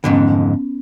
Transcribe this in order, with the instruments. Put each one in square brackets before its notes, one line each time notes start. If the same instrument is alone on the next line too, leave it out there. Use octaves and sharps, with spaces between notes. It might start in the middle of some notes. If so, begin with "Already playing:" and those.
[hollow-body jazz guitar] F2 G#2 D3 [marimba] B3 C#4